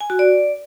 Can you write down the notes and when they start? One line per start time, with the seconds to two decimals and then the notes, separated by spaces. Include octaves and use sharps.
0.01 G#5
0.10 F#4
0.19 D5